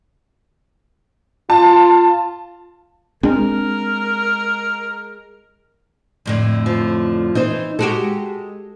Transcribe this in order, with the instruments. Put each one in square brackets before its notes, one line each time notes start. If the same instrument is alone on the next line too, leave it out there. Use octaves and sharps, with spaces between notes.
[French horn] F4 [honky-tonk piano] A5
[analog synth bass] G#3 [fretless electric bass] C4 D4 [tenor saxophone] A#4
[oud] F2 A2 D3
[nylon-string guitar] F3
[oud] E3 [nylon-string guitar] D#4 C5
[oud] G#3 F#4 G4 [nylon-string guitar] A4